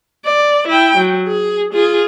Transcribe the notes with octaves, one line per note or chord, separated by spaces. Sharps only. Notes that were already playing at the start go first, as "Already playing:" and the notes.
D5
E4 G5
F#3
G#4
F4 G#4